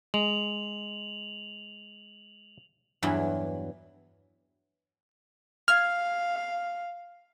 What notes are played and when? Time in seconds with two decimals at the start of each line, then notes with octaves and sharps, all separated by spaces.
0.14 G#3 F7 F#7
3.02 E2 G2 E3 F#3 E4
5.68 F5 F6 G#6